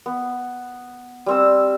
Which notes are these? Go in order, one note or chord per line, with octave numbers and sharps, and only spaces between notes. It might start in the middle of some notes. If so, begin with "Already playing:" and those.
B3
G3 C4 E6